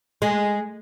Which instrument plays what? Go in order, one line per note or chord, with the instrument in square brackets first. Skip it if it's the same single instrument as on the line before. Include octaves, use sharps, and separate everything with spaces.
[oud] G#3